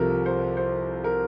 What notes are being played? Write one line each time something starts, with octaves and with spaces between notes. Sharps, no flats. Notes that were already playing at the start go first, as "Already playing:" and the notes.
Already playing: C2 C3 F3 A4 A#4
C5
C5
A#4